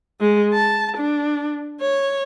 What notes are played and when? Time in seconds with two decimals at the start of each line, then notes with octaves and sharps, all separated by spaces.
0.21 G#3
0.53 A5
0.97 D4
1.81 C#5